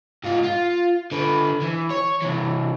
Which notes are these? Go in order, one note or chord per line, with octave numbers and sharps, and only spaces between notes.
G#2 F4
F4
D3 B4
E3
C#5
C3 E3